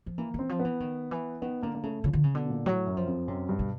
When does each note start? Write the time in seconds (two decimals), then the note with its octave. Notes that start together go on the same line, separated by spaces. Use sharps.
0.06 F3
0.18 E3 A#3
0.34 E3 C4
0.49 F3
0.59 B3
0.65 E3
0.80 D#3
1.11 E3
1.42 D#3 B3
1.63 D3 A#3
1.75 A#3
1.83 C#3 A3
2.04 C#3 F3
2.13 D3
2.24 C#3
2.34 B2 D3
2.45 B2
2.50 A#2
2.66 A2 F#3
2.87 F#2
2.97 F3
3.07 F2
3.28 F#2 C3
3.49 G2
3.59 B2